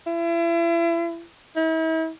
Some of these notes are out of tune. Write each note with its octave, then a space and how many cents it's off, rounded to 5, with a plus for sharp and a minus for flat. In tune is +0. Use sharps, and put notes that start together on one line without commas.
E4 +35
E4 -40